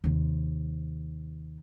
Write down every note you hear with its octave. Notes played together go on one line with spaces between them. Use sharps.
D#2 C3